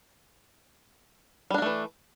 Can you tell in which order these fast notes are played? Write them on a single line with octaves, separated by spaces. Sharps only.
G3 D4 A#3 A3 E3